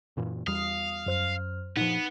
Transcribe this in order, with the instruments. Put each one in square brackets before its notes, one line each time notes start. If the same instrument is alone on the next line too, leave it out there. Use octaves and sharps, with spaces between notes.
[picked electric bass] F#2 A#2 E3
[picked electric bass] E2 G3 [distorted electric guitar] F5 [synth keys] D#6
[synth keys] F#2 C5 F6
[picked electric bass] A#2 F3 [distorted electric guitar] B3 [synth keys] D#4